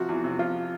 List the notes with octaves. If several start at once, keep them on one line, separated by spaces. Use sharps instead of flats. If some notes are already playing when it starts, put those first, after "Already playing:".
Already playing: C3 F3 F#4
E2
C3
F3 F4